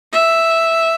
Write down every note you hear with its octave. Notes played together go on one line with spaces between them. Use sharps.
E5